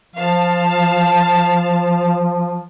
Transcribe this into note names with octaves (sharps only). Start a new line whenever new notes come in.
F3 F5 A5